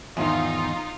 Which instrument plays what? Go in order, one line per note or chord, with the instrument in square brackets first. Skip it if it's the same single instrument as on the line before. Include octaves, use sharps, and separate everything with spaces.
[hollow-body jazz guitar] E2 G#2 D#3 [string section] D#4 F4